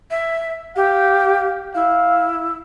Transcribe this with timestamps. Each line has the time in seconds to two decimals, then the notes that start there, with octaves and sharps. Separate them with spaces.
0.10 E5
0.76 G4 F5
1.74 E4 F5